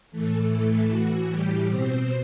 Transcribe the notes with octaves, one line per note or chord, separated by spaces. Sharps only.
A2 E3 A3 A4
A3 A4
F#4
G3 G4
B2 C4 C5